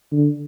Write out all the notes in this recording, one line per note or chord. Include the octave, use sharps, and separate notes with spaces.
D3